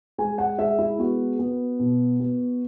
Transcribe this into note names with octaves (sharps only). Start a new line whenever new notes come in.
G#3 G#5
F#5
G#3 E5
E4
B3 F#4
B3
B2
B3